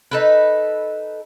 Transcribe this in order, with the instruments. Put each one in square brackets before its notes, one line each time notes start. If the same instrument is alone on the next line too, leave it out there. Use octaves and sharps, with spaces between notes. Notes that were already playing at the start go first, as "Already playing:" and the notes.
[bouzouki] D#4 A4 B4